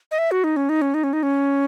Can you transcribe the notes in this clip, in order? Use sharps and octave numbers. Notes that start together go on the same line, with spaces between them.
D#5
E5
F#4
D#4
C#4
D#4
C#4
D#4
C#4
D#4
C#4